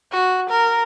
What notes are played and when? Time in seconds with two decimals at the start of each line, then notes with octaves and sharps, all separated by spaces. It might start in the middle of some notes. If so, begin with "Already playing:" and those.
0.12 F#4
0.49 A#4